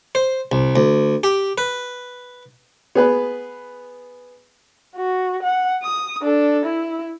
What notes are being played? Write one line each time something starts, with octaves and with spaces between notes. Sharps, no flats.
C5
C2
D2
G4
B4
B3 G#4 B4
F#4
F#5
D#6
D4 A4
E4